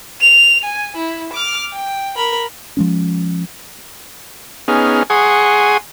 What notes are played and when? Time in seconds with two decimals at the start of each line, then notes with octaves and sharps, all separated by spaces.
0.20 F7
0.64 G#5
0.96 E4
1.32 D6 F6
1.72 G5
2.16 A#4 B5
2.77 F3 G#3 C#4
4.68 B3 C#4 D#4 G#4 F6
5.10 G#4 F#5 G#5 C6 C#6 D#6